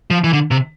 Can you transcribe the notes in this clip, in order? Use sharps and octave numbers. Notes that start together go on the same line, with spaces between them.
F3
E3
D3
C3